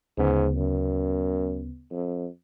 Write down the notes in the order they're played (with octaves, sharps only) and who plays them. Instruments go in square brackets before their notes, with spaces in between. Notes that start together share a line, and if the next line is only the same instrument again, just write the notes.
[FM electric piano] D2 C#3 B3 [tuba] G#2
[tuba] F#2
F2